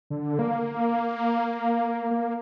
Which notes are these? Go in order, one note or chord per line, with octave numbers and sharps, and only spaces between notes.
D3
A#3
A#3